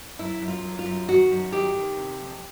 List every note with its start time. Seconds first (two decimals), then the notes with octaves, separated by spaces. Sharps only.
0.19 F#2 E4
0.41 F#2
0.48 F4
0.63 F#2
0.79 F4
0.86 F#2
1.08 D#3 F#4
1.31 F#2
1.52 D#3 G4
1.75 D#3
1.97 C3
2.20 F2